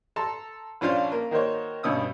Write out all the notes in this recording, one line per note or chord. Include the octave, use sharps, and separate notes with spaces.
A4 A5 A#5 C6
A#1 C#4 D4 F4 C5 F5
A#3
D#3 A#3 F#4 C5 C#5
G2 B2 C#4 D#6 E6